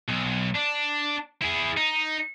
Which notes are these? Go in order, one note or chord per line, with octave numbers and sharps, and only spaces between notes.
B1
D4
E4 G#4
D#4